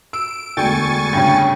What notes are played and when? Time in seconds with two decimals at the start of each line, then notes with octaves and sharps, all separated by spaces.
0.13 E6 D7
0.57 E1 D2 D3 G5 G#5 C#6 A6
1.13 G2 C#3 G5